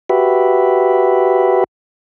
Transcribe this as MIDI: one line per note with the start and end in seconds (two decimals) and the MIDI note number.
0.10 1.64 66
0.10 1.64 67
0.10 1.64 71
0.10 1.64 76